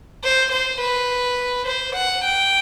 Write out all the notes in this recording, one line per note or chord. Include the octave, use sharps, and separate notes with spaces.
C5
C5
B4
C5
F#5
G5